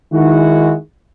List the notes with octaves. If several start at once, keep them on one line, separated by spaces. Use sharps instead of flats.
D#3 G#3 E4 F#4